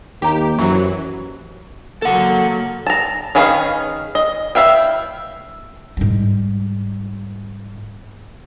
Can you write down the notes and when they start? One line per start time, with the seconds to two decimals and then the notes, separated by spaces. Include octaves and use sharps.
0.22 D#2 G4 A#5 D6
0.59 F#2 E3 F#3 G4 C5
2.02 F#3 A#3 A4 F#5
2.87 A5 A#5
3.35 D#3 C#4 G#4 B4 F5
4.15 D#5
4.55 E4 C5 E5 F5 G5
5.97 G#2 G3